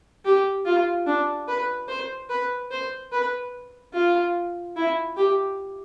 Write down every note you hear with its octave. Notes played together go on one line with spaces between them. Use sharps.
G4
F4
D4
B4
C5
B4
C5
B4
F4
E4
G4